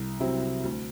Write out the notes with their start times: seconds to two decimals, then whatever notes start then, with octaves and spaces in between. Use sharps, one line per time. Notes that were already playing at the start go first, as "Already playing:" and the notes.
Already playing: C2
0.20 C3 F#3 C4 E4
0.64 D2